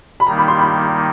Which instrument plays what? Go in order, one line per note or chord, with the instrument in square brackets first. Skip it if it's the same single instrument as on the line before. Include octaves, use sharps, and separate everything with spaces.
[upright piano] B5
[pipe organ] D#3 G3 A#3 D#4 [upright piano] A#5
[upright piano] B5
C6
B5